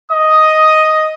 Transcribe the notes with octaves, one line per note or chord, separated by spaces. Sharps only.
D#5 D#6